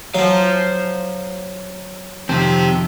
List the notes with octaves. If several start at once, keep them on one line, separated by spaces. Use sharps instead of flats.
F#3 C5 F5
F2 C3 D#3 C4 G4